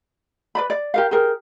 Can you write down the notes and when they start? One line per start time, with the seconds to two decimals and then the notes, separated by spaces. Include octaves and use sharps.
0.55 B4 D5 B5
0.70 D5
0.94 G4 A#4 F5
1.11 G4 G#4 A#4